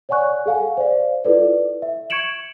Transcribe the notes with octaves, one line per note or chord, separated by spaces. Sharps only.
C#5 D5 F#5 G#5 C#6 F#6
G#4 A4 F5 F#5 G#5
C5 D5 F5
E4 F4 A4 B4 D5
E5
C#6 G#6 C#7 D7 E7 F#7